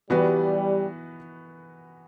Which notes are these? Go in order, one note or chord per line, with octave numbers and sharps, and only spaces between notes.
E3 G3 B3 F#4 B4